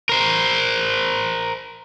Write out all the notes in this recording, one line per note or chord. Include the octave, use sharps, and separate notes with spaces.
A#4 C5